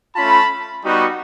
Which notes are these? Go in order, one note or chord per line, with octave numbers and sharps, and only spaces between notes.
A3 C#4 F4 A5 B5
G3 B3 D#4 F#4